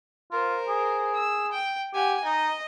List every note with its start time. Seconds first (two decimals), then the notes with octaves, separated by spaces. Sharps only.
0.32 F4 A#4 C5
0.68 G#4
1.15 E6
1.52 G5
1.94 G4 F#5 G#5
2.24 D#4 D#5